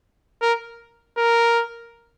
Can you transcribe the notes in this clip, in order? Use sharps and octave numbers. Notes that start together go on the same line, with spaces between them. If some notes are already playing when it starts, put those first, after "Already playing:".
A#4
A#4